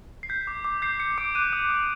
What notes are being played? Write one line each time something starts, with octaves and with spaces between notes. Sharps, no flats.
C7
G6 B6
D6
D6
G6 C7
G6 C#7
D6 D7
F#6 D#7
D#6
D#6